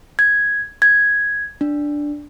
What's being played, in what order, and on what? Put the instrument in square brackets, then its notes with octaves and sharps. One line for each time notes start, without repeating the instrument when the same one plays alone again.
[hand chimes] G#6
G#6
D4